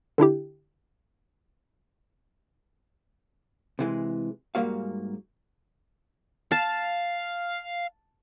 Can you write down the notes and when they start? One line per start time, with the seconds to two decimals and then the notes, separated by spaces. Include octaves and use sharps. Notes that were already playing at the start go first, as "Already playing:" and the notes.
0.18 D3 D4 E4 G4
3.79 C3 E3 G#3
4.55 G#2 G3 A#3 F#4 F5
6.52 F5 A5